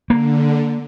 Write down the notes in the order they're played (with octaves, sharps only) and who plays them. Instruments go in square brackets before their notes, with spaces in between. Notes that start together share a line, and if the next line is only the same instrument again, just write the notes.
[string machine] D3 [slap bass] A#3